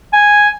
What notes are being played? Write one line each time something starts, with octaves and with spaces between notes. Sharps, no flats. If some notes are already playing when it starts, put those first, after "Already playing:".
G#5